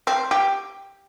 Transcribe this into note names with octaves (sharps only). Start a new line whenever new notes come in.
C4
G4